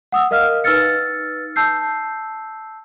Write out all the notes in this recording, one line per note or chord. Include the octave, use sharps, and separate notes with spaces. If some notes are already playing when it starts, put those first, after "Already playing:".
F#5 D#6 E6
A#4 D#5 F5 F6
D#4 B4 E6 F6 A6 C#7
A5 E6 G6 C7